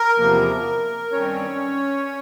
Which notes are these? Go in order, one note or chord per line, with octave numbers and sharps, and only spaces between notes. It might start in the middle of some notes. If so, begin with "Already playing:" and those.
Already playing: A#4
E2 C3 F3 A#3
G2 D#3 G3 C4 C#4 C#5